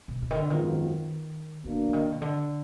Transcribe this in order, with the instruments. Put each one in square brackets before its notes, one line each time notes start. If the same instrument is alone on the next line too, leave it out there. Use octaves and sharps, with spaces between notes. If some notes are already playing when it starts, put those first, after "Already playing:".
[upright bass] B2
B2
D#3
D3
[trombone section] G#1 F#2 F3 B3 F4 [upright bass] D#3
[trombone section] B2 A#3 D4 [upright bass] D#3
[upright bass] D3
D#3
B2
D3